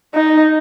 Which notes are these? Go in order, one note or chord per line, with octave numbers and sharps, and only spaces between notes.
D#4